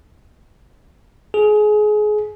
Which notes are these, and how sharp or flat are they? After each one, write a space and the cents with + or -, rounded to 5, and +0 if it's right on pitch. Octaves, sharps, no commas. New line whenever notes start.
G#4 +25